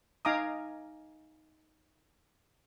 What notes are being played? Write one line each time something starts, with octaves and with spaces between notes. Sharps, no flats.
D#4 F5 G#5 A#5 D6 D#6